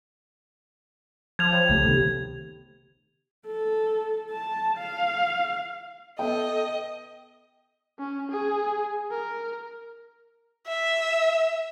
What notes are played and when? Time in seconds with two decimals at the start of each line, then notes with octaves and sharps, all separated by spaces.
1.39 F3 G#6 F7
1.52 C#5 G5 B5
1.69 C#2 A3 G4 A4
1.85 C3 D#3 B3
3.47 A4
4.31 A5
4.78 F5
6.19 B3 A4 D#5 E5 G5
7.99 C#4
8.31 G#4
9.11 A#4
10.68 E5